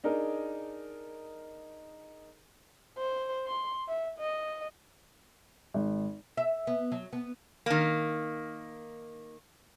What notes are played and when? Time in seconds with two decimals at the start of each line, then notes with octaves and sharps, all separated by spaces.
0.04 D4 D#4 G#4 A#4
2.98 C5
3.47 C6
3.88 E5
4.19 D#5
5.74 G#1
6.37 E5
6.67 B3
6.92 F#3
7.13 B3
7.66 D#3 A#3